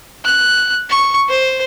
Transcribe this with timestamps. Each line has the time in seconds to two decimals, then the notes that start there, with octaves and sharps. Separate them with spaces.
0.25 F#6
0.90 C#6
1.29 C5